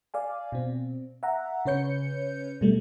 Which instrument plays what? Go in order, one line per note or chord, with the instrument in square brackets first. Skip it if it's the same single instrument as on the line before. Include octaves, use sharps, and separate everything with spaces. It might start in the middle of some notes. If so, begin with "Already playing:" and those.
[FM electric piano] D5 F5 G#5
B2 C4
E5 F#5 A#5
C#3 C#4 B4 C#5 G6 C#7
B2 G3 A3